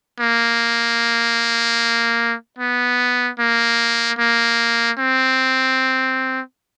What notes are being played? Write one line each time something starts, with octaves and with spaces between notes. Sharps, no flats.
A#3
B3
A#3
A#3
C4